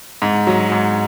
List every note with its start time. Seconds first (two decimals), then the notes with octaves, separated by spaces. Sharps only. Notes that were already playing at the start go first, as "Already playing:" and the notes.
0.22 G#2
0.47 F#3
0.72 G#2